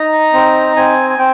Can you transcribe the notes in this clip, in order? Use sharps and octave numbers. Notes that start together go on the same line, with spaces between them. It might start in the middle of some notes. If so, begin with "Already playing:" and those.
Already playing: D#4 A#5
C4
C4 G#5
G#5
C4 G5